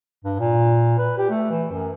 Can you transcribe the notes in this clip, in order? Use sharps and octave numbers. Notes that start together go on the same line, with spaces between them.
G2
A#2
B4
G4
A3
E3
F#2